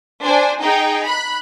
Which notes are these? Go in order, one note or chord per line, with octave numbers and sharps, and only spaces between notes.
D4 C5 G#5
D#4 G#4 G5
B5 F#6